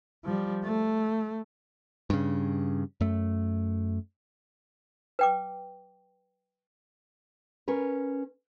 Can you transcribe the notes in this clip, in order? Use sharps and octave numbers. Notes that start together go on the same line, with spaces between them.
F3 G3
A3
G2 C#3
F#2 A3
B4 G5 D6
C#4 A#4 B4